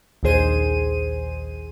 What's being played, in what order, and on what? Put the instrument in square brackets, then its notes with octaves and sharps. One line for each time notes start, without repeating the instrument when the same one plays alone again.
[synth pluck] A#1 D#2 D#3 G#4 C5 D#7